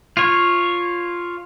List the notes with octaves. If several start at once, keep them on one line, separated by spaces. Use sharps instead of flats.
F4 C#5